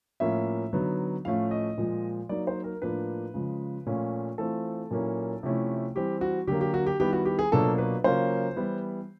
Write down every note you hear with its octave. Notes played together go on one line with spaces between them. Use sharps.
A2 F3 A#3 C#4 E5
D3 F#3 B3 D#4
A2 F3 A3 C#4 F5
D#5
A#2 F3 G#3
F#3 A#3 D#4 D5
C5
A#4
A2 F3 A#3 D4 B4
C#3 F3 G#3
A#2 F3 A3 C#4 F4
E3 A3 C4 F4 A4
A#2 F#3 A#3 C#4 E4
C3 F3 A3 C#4 E4
E3 G3 C4 G4
F#4
D3 F#3 A#3 G4
G4
F#4
G4
D#3 G3 B3 E4 G4
F#4
G4
G#4
B2 F#3 A#3 D4 F4 A4
B4
C#3 F#3 A#3 C#4 F4 C5
E3 G3 B3 E4